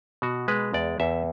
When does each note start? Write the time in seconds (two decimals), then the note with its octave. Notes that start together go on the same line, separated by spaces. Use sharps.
0.22 B2 F#4
0.48 G#3 B4
0.74 E2 D5
1.00 E2 E5